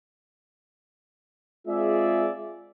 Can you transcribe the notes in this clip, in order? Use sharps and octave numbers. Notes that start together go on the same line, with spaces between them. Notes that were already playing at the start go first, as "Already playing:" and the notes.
G#3 C4 F4 G#4 D5 E5